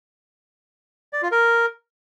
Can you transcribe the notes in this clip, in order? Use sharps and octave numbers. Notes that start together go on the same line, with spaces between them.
D5
F4
A#4